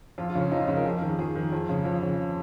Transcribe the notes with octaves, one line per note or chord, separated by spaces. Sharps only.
F2 F4
F4
C#3
C#4
F2 D#4
F4
C#3
A#4
F2 G#4
D#3
F2 G#4
D#3
F2
C#3
F2
C#3